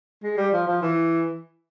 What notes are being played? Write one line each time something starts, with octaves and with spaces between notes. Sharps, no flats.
G#3
G3
F3
F3
E3